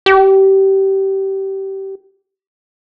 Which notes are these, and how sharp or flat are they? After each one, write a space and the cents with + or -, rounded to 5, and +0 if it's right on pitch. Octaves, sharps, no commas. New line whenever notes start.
G4 -20